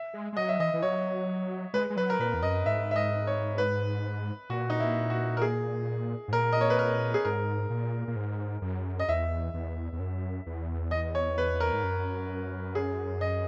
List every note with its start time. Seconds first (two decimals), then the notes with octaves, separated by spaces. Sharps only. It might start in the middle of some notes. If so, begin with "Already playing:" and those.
Already playing: E5
0.14 G#3
0.33 G#3
0.37 F#3 D#5
0.49 E5
0.59 E3 D#5
0.74 E3
0.82 F#3 C#5
1.73 G#3 B4
1.90 G#3
1.97 F#3 B4
2.10 A#4
2.19 A#2 B4
2.34 E2
2.43 F#2 D#5
2.66 G#2 E5
2.91 E5
2.96 D#5
3.27 C#5
3.58 B4
4.50 A#2 F#4
4.70 D#4
4.80 E4
5.10 F#4
5.37 A#4
5.42 G#4
6.28 G#2
6.32 A#2 A#4
6.53 D#5
6.61 C#5
6.70 B4
6.79 A#4
7.14 G#4
7.25 G#2 A#4
7.70 A#2
8.08 A#2
8.16 G#2
8.62 F#2
9.00 D#5
9.08 E2 E5
9.54 E2
9.93 E2
9.99 F#2
10.46 E2
10.91 D#5
11.15 C#5
11.38 B4
11.60 A#4
11.73 G#2
11.84 F#2
12.75 G#4
13.21 D#5